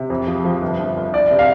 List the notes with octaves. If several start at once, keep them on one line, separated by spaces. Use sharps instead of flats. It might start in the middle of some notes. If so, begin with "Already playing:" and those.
Already playing: C3
F2
F3
F3
G1
G1
G1
C2 D5
C3
F5